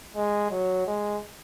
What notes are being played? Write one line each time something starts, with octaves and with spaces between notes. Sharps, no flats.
G#3
F#3
G#3